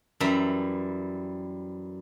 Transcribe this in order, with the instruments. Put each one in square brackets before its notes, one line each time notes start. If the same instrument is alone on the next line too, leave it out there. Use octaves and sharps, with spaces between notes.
[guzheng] F#2 E3 G3 E5 A#5 B5